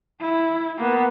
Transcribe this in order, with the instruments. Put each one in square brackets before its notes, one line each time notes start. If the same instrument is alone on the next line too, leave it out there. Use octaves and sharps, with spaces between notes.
[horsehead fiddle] E4
A#3 B3